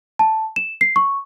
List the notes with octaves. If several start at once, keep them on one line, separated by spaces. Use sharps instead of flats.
A5
E7
C7
C#6